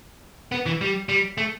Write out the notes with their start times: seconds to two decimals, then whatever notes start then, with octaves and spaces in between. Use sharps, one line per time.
0.52 B3
0.66 E3
0.81 G3
1.09 G3
1.38 A3